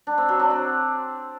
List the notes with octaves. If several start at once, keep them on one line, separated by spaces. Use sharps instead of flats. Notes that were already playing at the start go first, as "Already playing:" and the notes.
D4
C4
F#3
D4
C4